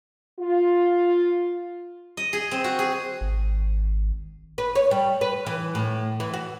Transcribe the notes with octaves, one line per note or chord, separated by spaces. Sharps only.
F4
D#5
G#4
C4
F#4
G#4
G#1
B4
C#5
G3
B4
E3
A2
E3
F#4